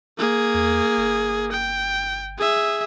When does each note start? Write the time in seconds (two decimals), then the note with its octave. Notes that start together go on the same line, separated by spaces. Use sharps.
0.18 A#3 G#4
0.54 E2
0.97 G1
1.52 G5
2.38 G#4 E5